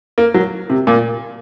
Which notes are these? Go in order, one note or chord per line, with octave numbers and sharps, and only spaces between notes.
A#3
F#3
C3
A#2